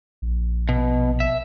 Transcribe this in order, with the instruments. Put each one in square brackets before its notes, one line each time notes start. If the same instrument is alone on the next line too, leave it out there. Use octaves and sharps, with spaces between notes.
[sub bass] A#1
[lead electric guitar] B2
E5